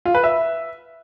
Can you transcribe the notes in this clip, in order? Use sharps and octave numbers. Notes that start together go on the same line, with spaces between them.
F4
B4
E5